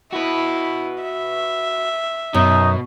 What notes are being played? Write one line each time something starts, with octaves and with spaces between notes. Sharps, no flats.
E4 F#4 B4
E5
F#2 B2 D#4